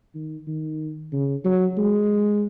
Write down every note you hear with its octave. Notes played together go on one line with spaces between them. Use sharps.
D#3
D#3
C#3
F#3
G#3